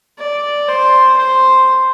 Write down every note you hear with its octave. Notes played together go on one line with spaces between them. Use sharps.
D5
C5
C5